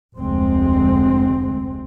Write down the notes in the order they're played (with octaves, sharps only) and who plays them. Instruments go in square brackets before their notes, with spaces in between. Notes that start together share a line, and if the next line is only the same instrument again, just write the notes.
[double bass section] F1 D2 G#3 C4